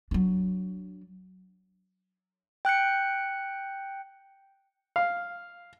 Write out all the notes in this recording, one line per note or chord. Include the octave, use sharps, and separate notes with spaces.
F#3 D4
G5 F#6 G6 C#7
F5